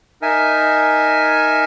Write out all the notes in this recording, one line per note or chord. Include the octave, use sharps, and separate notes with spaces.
D#4 A#4 E5 G#5